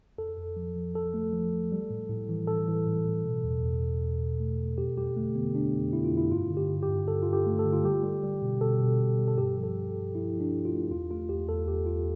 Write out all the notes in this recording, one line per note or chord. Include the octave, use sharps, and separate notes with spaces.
F2 A4
F2
F3
F3
F3 A4
A3
F3
F3
G3
A2
A2
E3
A2 A4
E3
A2
A2
B2
E2
E2
E2
E2
B2
A3
B2
F2 G4
G3 G4
D3 A3
D3 B3
D3 D4
F2
D3 E4
F4
F2
E4
G2 F4
D3
G4
G2
G4
G2
G2 A4
G2 F4
G4
A3
A4
D3
F4
G3 G4
G3
G3
B2
B2 A4
B2
B2
G3
A4
G2 G4
F3
A4
G2
G2
F3 E4
F3
D4
G2
F4
A3
E2 F4
A3 F4
E2 G4
E2 A4
E2 G4
E2 F4